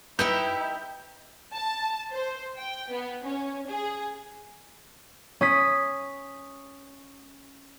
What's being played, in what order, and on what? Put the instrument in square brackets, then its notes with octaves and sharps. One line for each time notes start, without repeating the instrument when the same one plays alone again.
[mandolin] D#4 G4 E5 [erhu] E4 [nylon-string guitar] B4 G5 [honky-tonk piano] G6
[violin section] A5
C5
G5
B3
C#4
G#4
[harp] C#4 D#6 B6